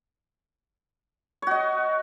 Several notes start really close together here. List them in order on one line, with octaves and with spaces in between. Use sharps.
C#5 F#4 D#5